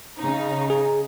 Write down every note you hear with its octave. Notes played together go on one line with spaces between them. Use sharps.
C#3 D#4
G#4